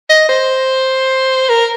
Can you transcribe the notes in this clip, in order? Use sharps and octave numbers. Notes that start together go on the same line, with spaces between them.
D#5
C5
A#4